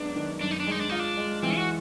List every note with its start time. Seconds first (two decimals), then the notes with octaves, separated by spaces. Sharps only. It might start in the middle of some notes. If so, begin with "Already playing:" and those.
Already playing: F#2 G#3 B3 D4
0.16 D#3
0.41 F#2 D4
0.51 D#4
0.60 D4
0.67 G#3 D#4
0.80 D4
0.89 D#4 F4
0.99 D4
1.17 G#3
1.43 E3 C4
1.56 F#4